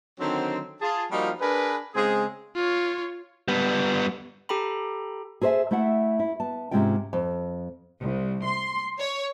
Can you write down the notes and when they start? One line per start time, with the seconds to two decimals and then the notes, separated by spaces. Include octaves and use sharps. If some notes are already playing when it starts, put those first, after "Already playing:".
0.20 D3 D#3 F#3 C4
0.81 F4 G#4 A5
1.11 F3 G3 A#3 D#4 F4 F#4
1.40 D4 G#4 A#4 B4
1.95 C#3 G#3 C4 G#4
2.56 F4 C#5
3.48 G3 B3
4.49 G4 A4 G5 A#5 B5
5.41 G#4 A4 C5 C#5 E5 G#5
5.71 A3 E4 E5 F#5
6.19 E4
6.40 B3 A5
6.71 G#2 C3 G#3 C#4 F4 G5
7.13 F2
8.01 C2
8.42 C6
9.00 C#5